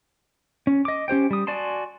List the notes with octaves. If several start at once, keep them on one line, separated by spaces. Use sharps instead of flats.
C#4
D#5 D6
C#4 G4 C5 G5
G3 D#6
F#4 D5 G#5 A5 C6